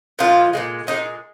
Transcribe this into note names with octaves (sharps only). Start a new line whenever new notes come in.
A#2 F3 G#3 F4
A#2 F3 G#3
A#2 F3 G#3 D#4